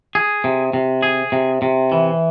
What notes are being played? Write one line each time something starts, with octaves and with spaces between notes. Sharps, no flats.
G#4
C3
C3
G#4
C3
C3
E3